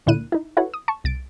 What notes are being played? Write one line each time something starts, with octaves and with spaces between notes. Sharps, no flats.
C#2 A#2 D3 E4 F#6 D#7
D#4 E4
E4 F#4 A4 B4 C#5 F#5
D#6
A5 C#6
C2 A6 D7